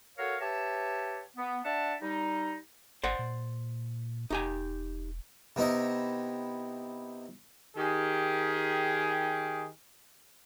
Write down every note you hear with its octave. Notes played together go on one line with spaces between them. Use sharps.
F#4 A4 A#4 C#5 F5
G4 B4 C#5 E5 A5
B3
D4 E5 F#5 A5
G3 D#4
G#1 C5 D5 F#5
A#2
E1 D#4 G4 G#5
C3 B3 D#4 E4 D#5
D#3 G4 G#4